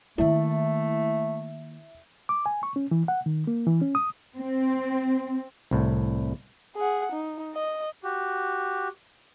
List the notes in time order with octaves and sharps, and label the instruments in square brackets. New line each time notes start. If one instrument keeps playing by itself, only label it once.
[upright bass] D#3 A#3 [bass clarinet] A3 [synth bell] E4 [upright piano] E5
[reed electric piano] D6
G#5
C#6
C#4
E3
F#5
D#3
A#3
E3
C#4
D#6
[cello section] C4
[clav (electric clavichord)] C2 A2
[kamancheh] G#4 F#5
D#4
D#5
[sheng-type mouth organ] F#4 G4